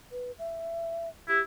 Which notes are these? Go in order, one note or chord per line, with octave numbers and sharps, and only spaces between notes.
B4
E5
E4 G4